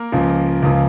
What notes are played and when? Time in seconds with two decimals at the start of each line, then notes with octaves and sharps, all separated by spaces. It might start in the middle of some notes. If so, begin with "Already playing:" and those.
Already playing: A#3 A#4
0.12 C#2 C#3 F3
0.62 C#2 C#3 F3